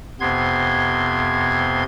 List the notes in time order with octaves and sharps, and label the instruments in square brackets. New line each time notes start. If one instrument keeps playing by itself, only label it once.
[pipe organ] F2 C3 B3 C6 G#6